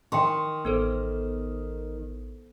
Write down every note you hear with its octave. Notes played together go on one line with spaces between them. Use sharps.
D#3 G5 C6 C#6
A1 B3 A4 C5